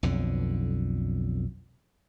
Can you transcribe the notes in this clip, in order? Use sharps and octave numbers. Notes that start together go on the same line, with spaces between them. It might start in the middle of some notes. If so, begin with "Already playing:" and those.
B1 F2 D3